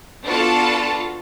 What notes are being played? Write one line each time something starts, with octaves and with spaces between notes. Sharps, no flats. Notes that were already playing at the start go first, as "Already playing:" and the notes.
B3 D4 F4 F#4 A4 A5